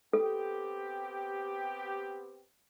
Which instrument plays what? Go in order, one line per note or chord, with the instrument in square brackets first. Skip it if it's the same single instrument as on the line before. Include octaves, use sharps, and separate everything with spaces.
[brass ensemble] B3 C4 G4 [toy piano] A4